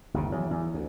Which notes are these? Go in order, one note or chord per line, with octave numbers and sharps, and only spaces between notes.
G1 D#2 C3
E2 F#3
E2
D2